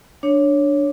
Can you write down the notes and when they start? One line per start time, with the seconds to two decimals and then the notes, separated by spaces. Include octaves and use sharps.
0.23 D4 C#5